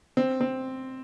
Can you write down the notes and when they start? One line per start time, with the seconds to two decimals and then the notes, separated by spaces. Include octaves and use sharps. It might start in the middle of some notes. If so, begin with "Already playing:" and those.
0.17 C4
0.41 C4